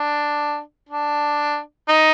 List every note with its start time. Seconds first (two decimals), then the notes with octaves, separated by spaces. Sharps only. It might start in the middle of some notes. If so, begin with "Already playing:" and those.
Already playing: D4
0.89 D4
1.88 D#4